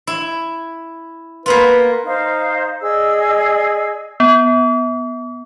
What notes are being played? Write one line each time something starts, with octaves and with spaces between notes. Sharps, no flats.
E4
A#3 B3 F4 B4
D#4 C5 F5
G#4 D5 D#5 E6
B3